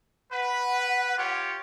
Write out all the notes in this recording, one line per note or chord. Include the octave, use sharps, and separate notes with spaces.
B4 F#5
F4 G4 C#5